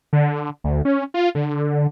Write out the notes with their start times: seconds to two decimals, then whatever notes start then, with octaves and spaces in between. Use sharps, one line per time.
0.13 D3
0.64 D2
0.85 C#4
1.14 F4
1.35 D3